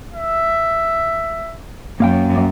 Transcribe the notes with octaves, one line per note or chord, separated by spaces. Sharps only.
E5
F#2 A#3 F5 G5